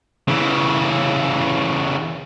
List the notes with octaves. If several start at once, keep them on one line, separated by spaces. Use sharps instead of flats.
C#3 E3